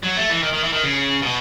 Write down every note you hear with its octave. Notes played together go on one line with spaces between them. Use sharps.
F#3
A3
E3
D#3
D#3
E3
D#3
C#3
B2